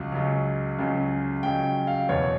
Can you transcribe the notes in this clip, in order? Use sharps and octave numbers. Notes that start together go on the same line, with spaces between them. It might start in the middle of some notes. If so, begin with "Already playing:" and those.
Already playing: C#2 C#3 F#3
C#2 C#3 F#3
C#2 C#3 F#3
C#2 C#3 F#3 G5
F5
E2 B2 F#3 C#5